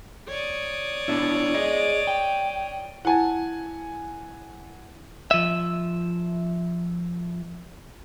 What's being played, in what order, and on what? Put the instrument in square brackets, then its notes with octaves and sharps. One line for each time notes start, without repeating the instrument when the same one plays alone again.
[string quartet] C#5 D5 D#6
[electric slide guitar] B3 D4 E4
G#4 D#5
G5
[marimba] E4 [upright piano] F#5 G#5 A5
[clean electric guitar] F3 E5